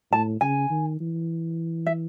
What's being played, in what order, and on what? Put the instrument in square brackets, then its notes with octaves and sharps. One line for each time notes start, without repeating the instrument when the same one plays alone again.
[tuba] A2 [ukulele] A5
[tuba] C#3 [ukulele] G#5
[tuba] D#3
E3
[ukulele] E5